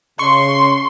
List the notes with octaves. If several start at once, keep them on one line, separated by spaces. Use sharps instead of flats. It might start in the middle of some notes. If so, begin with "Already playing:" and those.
C#3 C6 C#6